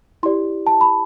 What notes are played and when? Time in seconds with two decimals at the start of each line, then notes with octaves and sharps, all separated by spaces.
0.23 E4 G4 D5 C6
0.67 A5
0.81 B5